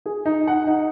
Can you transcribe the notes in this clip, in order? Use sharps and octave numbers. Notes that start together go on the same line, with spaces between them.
G#4
D#4
F#5
D#4